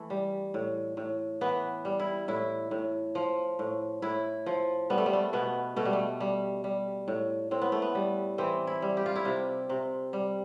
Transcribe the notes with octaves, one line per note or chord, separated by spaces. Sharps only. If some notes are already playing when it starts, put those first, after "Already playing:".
Already playing: E3 A3
G3
A2
A2
E3 B3
G3
E4
A2 E4
A2
F3
A2
A2 E4
F3
G3 B3
A3
G3
A3
B2 B3
B2 A3
G3
A3
G3
G3
A2
A2 C4
B3
A3
B3
G3
E3 C4
E4
G3
G4
F4
E4
C3 F4
C3
G3